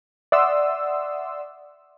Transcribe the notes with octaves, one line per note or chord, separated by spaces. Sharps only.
D5 E5 F#5 C6 D#6 E6